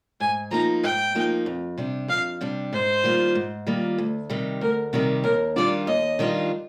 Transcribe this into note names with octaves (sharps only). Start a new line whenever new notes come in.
G#2 G#5
F3 A#3 D#4 A#5
G#2 G5
F3 A#3 D#4
F2
C3 G3 D4
F2 F5
C3 G3 D4
G#2 C5
D#3 G3 A#3 F4
G#2
D#3 G3 A#3 F4
D2
C3 D#3 G3
D2 A#4
C3 D#3 G3 A#4
D#2 A#4
D#3 G3 D4 F4 D5
D#2 D#5
D#3 G3 D4 F4